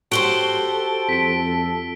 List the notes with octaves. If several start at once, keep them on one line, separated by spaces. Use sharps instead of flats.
F#4 G4 A4 C5 D7 G7
F2 B6 D7